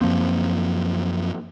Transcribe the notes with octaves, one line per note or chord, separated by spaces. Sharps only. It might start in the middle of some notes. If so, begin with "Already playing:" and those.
F#2 F3 A#3 C4